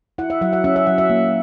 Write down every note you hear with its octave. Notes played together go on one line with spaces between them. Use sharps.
E4 F#5
E5
F#3 F#5
F#5
C#4 E5
E5
F#3 F#5
E5
A#3